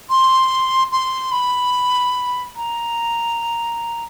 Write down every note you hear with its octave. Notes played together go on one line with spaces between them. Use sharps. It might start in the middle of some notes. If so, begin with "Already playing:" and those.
C6
C6
B5
A#5